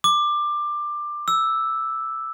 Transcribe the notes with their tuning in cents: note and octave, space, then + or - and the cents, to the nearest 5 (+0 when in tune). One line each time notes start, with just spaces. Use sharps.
D6 +20
E6 +0